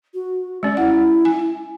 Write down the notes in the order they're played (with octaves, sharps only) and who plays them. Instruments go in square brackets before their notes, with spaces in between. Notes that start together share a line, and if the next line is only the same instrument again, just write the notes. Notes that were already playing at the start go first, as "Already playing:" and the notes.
[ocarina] F#4
[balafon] G#3 C#4 [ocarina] D5
[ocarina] E4 [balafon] F#5
[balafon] G#5